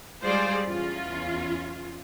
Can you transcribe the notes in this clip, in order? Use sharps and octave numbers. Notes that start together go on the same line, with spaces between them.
G3 G#3 F4 G#4 C5 D5
E2 C#4 F4